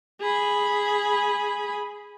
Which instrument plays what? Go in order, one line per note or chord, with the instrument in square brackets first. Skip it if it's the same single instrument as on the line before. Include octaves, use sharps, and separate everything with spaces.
[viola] G#4 B5